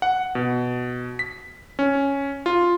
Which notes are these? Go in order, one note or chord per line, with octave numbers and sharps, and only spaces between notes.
F#5
B2
B6
C#4
F4